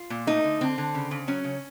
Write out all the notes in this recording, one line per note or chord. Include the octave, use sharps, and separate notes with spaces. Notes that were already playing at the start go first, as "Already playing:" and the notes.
Already playing: F4
A#2
A3 D#4
D3
D3 C4
D3
C#3
C#3
F#3 C#4
C#3